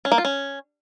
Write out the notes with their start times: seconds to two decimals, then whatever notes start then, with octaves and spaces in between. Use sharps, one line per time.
0.05 C#4
0.12 A#3
0.18 F4
0.25 C#4